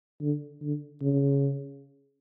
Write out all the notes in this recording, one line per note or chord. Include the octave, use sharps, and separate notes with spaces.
D3
D3
C#3